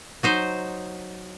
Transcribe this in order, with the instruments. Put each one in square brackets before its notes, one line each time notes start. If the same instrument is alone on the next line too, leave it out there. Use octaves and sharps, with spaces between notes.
[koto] F#3 D#4 C5